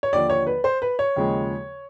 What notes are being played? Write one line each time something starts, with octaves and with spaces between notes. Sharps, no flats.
C#5
D#2 D3 F3 D5
C#5
B4
C5
B4
C#5
D#2 C#3 F3 G#3